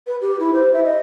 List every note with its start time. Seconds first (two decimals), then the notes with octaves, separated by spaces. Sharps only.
0.07 B4
0.21 G4
0.40 E4
0.53 C5
0.73 E5
0.84 D#5